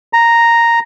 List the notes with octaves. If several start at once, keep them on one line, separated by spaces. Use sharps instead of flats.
A#5